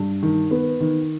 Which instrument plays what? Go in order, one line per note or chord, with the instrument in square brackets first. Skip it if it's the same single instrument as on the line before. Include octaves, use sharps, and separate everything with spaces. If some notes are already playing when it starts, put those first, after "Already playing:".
Already playing: [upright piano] G2
D#3
B3
D#3